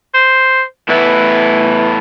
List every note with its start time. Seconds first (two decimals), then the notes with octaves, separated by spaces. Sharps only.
0.14 C5
0.89 A2 E3 B3 E4